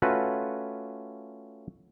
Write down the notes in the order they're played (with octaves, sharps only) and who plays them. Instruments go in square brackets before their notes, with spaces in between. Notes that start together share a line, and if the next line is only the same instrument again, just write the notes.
[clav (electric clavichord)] A3 C#4 F4 F#4 B4